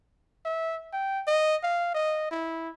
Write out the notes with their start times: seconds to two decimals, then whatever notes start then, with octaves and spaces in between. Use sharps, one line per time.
0.45 E5
0.93 G5
1.27 D#5
1.63 F5
1.94 D#5
2.31 E4